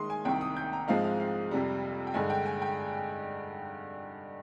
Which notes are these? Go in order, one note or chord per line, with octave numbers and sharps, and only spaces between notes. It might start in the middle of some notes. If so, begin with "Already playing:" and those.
Already playing: D#3 G#3 C6 D#6
G#5
C2 C3 D#3 G5
D#6
G6
A#5
G#2 F3 G#3 C4 D#4 F5
F5
F5
F2 C3 G3
G5
G2 D3 G#3 D#4 G#5
G5
G#5
G5